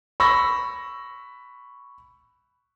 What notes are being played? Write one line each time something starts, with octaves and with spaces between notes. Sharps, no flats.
B5 C#6 E6 A#6